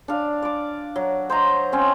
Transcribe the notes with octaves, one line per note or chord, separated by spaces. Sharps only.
D4 F5
D5 D6
F#3
C5 D#5 A#5
C4 C#4